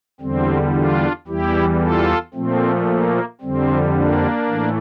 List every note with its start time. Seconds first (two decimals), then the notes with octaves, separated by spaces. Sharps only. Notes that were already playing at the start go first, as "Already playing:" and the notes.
0.20 E2 D3 G3 C4
0.75 D4 F4
1.27 E2 E3 G3 E4 G4
1.81 F4 A4
2.34 A#2 F3 A3 C4
2.88 A#3
3.41 F2 D3 G3 C4
3.94 A#3 D4
4.48 A2 E3 A3